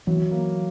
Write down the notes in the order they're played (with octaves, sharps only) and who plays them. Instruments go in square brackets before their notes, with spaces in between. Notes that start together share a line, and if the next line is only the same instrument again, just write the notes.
[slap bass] E3 [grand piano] F#3
[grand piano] A#3